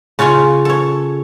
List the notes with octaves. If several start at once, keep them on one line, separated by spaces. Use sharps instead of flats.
C#3 C#4 F4 C#5 C6
A4 C#5